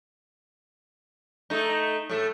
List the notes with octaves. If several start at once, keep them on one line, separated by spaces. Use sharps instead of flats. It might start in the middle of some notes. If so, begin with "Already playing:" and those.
A3 D#4
A2 A3